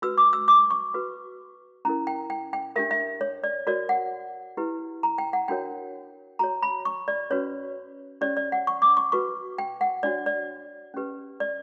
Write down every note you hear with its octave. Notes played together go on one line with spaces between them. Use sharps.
F#4 B4 E6
D6
E6
D6
C#6
F#4 B4
C#4 E4 A#4 A#5
G5
G5
G5
D4 G4 A#4 E5
E5
C#5
D5
F#4 A#4 C#5 D5
F#5
E4 G4 B4
A#5
G5
F#5
D4 F#4 A#4 C#5 G5
F#4 C#5 A#5
B5
C#6
D5
C#4 F#4 B4 C#5
C#4 G4 C#5 D5
D5
F#5
C#6
D6
C#6
F#4 B4 C#6
G5
F#5
D4 F#4 C#5 D5
D5
C#4 G4 B4
D5